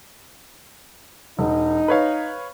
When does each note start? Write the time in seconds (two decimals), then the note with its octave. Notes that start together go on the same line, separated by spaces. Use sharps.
1.39 E1 D#4
1.88 B4 C#5 F5